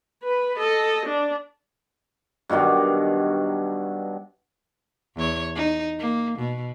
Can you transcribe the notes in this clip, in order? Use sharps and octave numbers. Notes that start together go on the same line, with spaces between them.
B4
A4 D#5
D4
G2 B2 D#3 F#3
E2 C#5
D#4
A#3
B2